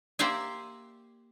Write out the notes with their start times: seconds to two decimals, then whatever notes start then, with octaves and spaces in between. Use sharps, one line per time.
0.19 A#3 G4 C5 D5 E5 G#5